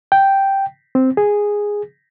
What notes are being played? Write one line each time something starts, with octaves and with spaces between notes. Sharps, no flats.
G5
C4
G#4